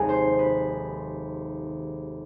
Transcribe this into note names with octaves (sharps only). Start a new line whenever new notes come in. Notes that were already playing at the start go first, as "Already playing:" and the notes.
Already playing: F1 D#2 D#3 G#3 G#4
C5
B4